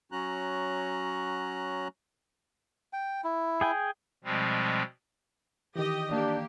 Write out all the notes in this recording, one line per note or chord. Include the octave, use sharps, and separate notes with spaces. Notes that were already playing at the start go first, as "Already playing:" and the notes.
F#3 C#4 F#4 A#5 F#6
G5
E4
G#4 G5 G#5
B2 F3 G3 G#3 C4
D#3 E3 G4 D#5
A#3 D4 G4